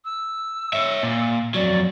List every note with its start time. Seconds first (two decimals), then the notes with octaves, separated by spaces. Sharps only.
0.04 E6
0.73 C#5 E5
1.03 A#2
1.55 F2 F#3 D5